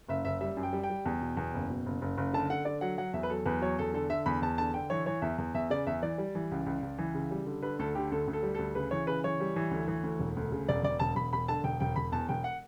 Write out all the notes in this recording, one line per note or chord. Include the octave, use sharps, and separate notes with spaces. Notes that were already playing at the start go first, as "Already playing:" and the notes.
F#1 E5
F#1 E5
G3 E5
F#2
G5
G3
G5
G3
E2
B2
E2
F#1
B2
F#1
F#1
F#1
D3 A5
D3 F#5
D3 D5
F#3 F#5
F#3 F#5
E2 E5
B4
F#3 A4
E2 B4
F#3 C#5
E2 A4
D3 A4
D3 E5
E2 B5
E2 A5
D3 A5
D3 G5
E3 C#5
E3 C#5
E2 E5
E2
E2 E5
C#3 D5
E2 E5
E3 D5
G3
E3
C#2
C#2
C#2
E3
C#3
G3
D3
D3 B4
D2 A4
D3 G4
D2 A4
D2
A4
G3
D2 A4
C#3 B4
E3 C#5
C#3 B4
E3 C#5
G3
E3
D2
E3
D2
E1
D2
C#3
E1 D5
E1 D5
E1 A5
E1 B5
E1 B5
D3 A5
E1 G5
E1 G5
E1 B5
E2 A5
E1 G5
F#5